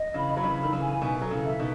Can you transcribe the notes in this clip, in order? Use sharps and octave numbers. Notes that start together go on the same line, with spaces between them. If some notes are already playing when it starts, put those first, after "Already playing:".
Already playing: D#5
C#3 E3 B5
F#3 B5
C#3 E3
A4
D#3
C#3 E3
G#5
B2 D#3 E5
F#3 A4
C#3 E3
E5
B2 D#3